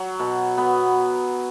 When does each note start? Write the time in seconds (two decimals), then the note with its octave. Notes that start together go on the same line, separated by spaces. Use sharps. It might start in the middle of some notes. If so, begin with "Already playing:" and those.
Already playing: F#3
0.19 B2
0.58 B3